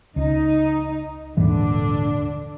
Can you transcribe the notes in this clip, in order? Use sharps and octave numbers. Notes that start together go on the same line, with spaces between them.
C#2 D#4
D#1 G#2 D3 E3 D4